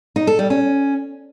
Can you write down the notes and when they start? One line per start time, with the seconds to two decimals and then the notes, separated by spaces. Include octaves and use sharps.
0.16 D#4
0.27 A4
0.39 G3
0.50 C#4